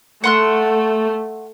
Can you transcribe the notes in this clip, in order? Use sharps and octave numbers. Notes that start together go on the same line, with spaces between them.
A3 F#5 C6 F#6